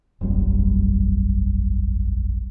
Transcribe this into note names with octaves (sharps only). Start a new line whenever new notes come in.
E1 A#1 F#2 G3